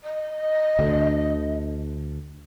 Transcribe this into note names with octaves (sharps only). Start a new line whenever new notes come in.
D#5
D2 D3